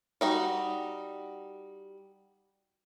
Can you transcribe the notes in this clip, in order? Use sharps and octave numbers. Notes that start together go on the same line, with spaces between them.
G3 D#4 F#4